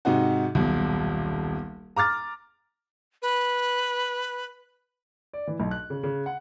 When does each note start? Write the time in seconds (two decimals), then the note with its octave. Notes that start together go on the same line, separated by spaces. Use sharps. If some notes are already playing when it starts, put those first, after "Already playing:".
0.05 G#2 C3 D#4 F#4
0.55 D#1 B1
1.96 A#5 D6 F6 A6
3.22 B4
5.33 D5
5.47 E3
5.60 B1
5.71 F#6
5.90 C#3
6.03 C#3
6.26 F#5